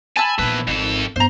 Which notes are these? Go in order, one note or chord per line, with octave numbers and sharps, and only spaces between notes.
G#5 A5 B5 E6
A#1 E2 D#3 B4
G#1 F2 A4
G2 B3 C5 A#5